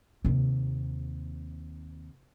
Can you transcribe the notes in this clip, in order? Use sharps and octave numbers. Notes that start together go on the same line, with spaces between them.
D#2 C3